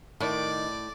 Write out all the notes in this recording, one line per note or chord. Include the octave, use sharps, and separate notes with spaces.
A2 D#3 D5